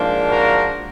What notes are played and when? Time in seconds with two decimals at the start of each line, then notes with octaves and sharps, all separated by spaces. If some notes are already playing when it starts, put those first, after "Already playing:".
Already playing: G#2 F3 A#3 D4
0.29 F#4 A#4